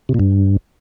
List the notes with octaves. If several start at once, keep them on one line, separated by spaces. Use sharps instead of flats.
C3
A#2
G2